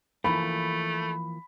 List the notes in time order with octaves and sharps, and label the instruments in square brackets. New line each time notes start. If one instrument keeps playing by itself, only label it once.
[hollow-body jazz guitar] E3 F3 A#3 [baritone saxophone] A3 [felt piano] B5